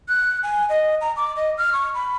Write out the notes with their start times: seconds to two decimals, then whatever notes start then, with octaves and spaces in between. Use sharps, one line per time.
0.08 F#6
0.43 G#5
0.69 D#5
1.01 A#5
1.16 D6
1.36 D#5
1.58 F6
1.73 C#6
1.94 B5